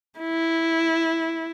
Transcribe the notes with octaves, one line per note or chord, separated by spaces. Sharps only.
E4